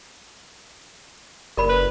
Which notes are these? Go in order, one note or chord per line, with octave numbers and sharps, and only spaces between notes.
F#1 A#4 D5 B5
B4